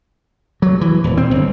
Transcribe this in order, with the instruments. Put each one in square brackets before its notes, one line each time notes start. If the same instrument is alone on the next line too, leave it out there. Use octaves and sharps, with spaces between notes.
[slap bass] F#3
E3
D#1
C4
G1